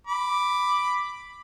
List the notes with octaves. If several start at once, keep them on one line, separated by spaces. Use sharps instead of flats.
B5 D6